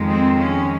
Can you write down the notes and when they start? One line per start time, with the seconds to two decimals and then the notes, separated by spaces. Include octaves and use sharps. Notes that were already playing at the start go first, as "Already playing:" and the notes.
Already playing: F2 D#3 G#3
0.08 C4
0.39 C#4